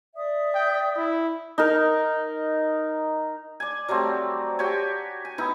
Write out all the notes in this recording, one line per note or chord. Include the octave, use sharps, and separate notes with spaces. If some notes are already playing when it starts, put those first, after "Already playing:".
D5 E5 D#6
G5
E4
D#4 A#4
D5 G#5
F#3 G3 A3 C4
F#4 G4 C#5 G#5
G#5
B3 D#4 E4